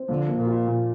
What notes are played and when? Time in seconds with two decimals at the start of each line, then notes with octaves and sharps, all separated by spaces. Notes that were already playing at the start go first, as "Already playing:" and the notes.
Already playing: C4
0.09 D3 F3
0.28 A#3
0.37 A#2
0.47 F4
0.67 A#2